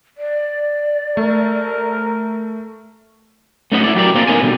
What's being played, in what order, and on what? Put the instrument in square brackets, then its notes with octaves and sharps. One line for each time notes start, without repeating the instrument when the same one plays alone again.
[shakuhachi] D5
[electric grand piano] A3 [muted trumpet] A#4
[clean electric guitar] A3 C#4 D#4 F#4 B4 D#5
E4 A4 D5
F#3 G4 A#4 D5
A#3 C4 C#4 F4 A4 A#4
B3 D#4 A#4 C#5 G#5
B2 D3 G3